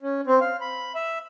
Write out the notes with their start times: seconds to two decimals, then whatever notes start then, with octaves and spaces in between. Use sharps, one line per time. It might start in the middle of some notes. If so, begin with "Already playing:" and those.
0.02 C#4
0.27 C4
0.41 F5
0.61 B5
0.95 E5